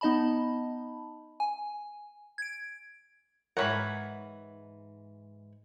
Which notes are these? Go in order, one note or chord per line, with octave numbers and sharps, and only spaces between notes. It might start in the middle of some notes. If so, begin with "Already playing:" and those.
B3 D#4 D#5 A5 B5
G#5
G#6 D7
F2 G#2 E3 A#4 C#5 F#5 B5